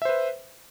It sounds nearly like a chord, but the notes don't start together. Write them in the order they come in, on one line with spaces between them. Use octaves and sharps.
E5 C5 B4